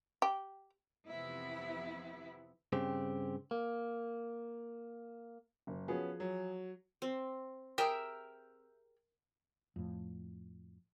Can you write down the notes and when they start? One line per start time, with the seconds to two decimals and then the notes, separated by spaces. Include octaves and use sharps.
0.22 G4
1.07 F2 C3 E3 B3 E4
2.73 G2 C#3 C4 G4
3.51 A#3
5.67 F#1
5.88 F3 B3 C#4 F#4 G#4
6.20 F#3
7.02 C4
7.78 G4 G#4 A#4 E5 G5
9.76 F2 A2